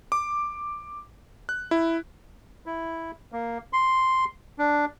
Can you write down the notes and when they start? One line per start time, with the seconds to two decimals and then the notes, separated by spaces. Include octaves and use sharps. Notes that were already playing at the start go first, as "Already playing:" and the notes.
0.12 D6
1.49 F#6
1.71 E4
2.66 E4
3.32 A#3
3.73 C6
4.59 D4